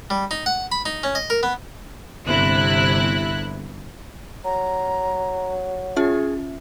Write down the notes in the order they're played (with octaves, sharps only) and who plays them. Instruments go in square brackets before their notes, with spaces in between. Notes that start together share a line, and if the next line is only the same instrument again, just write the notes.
[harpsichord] G3
D#4
F#5
B5
D#4
C#4
D#5
A#4
B3
[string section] G1 C3 E4 F#6
[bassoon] F#3 [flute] A#5
[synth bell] C#4 F4 E5 [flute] G#4